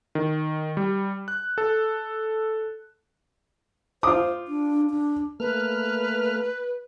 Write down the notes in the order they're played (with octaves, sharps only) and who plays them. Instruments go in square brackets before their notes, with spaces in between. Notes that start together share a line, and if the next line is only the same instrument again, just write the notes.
[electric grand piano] D#3
G3
F#6
A4
[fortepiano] F4 D#6 [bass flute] C5 [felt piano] D6
[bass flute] D4
D4
[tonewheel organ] A3 A#3 F6 [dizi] B4